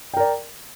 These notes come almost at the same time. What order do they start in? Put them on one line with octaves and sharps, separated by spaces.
G5 A#4 D5